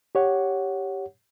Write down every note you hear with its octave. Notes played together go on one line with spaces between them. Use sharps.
G4 C#5 F#5